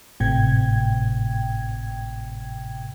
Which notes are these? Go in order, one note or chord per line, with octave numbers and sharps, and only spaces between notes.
G#1 A2 C3 G5 G#6